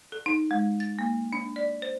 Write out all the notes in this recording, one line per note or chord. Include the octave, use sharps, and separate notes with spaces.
A4
D#4
G#3
A6
A#3
D4
D5
C5